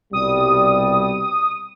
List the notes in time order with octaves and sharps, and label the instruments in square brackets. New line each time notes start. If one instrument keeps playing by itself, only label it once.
[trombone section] C2 B2 G3 [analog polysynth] D#6